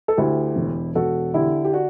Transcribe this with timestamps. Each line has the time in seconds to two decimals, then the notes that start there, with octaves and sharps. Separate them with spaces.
0.08 A4
0.17 D2 E4 G4
0.56 E1
0.95 E1 F#4 A4
1.34 D3 E4 G4
1.64 G4
1.73 D4 F#4